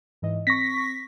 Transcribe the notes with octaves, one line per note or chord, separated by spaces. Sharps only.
G#2 E3 D#5
C4 C#6 A#6 B6